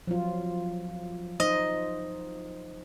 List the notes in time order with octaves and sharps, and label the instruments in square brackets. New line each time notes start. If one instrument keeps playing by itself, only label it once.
[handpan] F3 F#3 F4
[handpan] D#4 C5 [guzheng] D#5